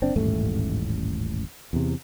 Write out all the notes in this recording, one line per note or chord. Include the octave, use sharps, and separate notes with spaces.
F#1 C4 D4
D#1 A1 G#2 A3
E2 C3